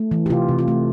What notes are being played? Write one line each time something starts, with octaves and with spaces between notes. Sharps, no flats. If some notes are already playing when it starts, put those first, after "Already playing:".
Already playing: A3
E3
G4
C3 F4
C3
F4
A3